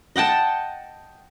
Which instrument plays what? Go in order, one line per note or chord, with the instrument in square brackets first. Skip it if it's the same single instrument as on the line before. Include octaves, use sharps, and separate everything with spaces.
[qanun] D#5 F#5 G5 A5